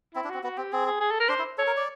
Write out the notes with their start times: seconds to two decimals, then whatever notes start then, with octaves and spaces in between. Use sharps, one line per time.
0.15 C4 E4
0.24 D4
0.29 C4 F#4
0.43 B3 F#4
0.58 C4 G4
0.73 C4 G#4
0.86 G#4
1.00 G#4
1.11 A4
1.20 A#4
1.29 D4 C5
1.39 E4
1.58 A4 C#5
1.67 A#4
1.77 D5